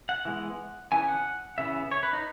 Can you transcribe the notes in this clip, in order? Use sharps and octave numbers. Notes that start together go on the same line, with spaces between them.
F#5
E3 G#3 B3
C#3 E3 B3 G#5
F#5
C#3 E3 B3 E5
C#5
B4
D#4